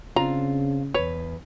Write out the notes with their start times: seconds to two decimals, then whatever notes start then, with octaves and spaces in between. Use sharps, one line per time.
0.16 C#3 C4 D4 F4 A#5
0.94 E2 B4 C#5